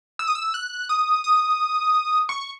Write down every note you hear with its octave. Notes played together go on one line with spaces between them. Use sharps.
E6
D#6
E6
F#6
D#6
D#6
C#6